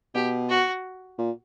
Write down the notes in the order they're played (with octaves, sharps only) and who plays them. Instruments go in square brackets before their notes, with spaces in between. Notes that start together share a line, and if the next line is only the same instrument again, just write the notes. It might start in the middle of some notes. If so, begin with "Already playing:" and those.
[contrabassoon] B2 [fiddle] G4
[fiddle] F#4
[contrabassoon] A#2